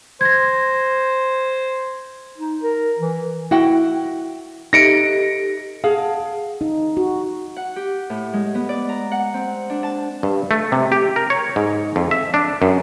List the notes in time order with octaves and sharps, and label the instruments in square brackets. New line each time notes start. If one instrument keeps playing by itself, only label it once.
[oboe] C5 [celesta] G#6 A#6
[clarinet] D#4
A#4
E3
[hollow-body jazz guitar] E4 [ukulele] F#4 F#5 G5
[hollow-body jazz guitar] D#4 [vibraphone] G4 A4 [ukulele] B4 E5 [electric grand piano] A#6 C#7 D7
[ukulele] G#4 [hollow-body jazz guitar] F5 [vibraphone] F#5 A5
[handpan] D#4
F#4
[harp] F#5
G4
A2
G#3
B3
D5
A#5
F#5
C4
D4
A5
[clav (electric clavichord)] G2
A3
C3
G4
A#4
C#5
G#2
F2
E5
D4
F#2